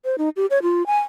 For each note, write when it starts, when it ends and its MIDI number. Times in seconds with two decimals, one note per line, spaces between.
0.05 0.16 72
0.18 0.29 63
0.36 0.46 67
0.50 0.59 73
0.62 0.86 65
0.86 1.00 80